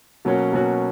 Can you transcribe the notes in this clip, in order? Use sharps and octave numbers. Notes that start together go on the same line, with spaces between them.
B2 F#3 A#3 C#4 F#4
B2 F#3 A#3 C#4 F#4